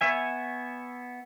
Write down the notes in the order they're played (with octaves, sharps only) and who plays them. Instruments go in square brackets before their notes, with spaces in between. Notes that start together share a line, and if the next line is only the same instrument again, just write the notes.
[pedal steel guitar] B3 C#5 E5 G#5